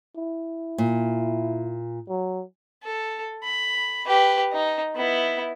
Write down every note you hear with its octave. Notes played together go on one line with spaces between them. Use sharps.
E4
A#2
F#3
A4
B5
G4 B4
D#4
B3 E4